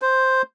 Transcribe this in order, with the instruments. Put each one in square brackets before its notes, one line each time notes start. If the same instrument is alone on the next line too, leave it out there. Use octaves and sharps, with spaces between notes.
[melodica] C5